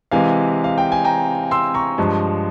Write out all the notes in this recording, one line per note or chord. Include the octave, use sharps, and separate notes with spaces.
C3 E3 G#3 F5 G#5
F5
G5
G#5
G5 A#5
C6 E6
A#5 C#6
G2 F3 G#3